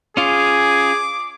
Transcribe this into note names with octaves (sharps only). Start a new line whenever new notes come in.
C#4 F4 G#4 D6